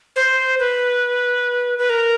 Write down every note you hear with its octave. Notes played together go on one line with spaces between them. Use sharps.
C5
B4
B4
A#4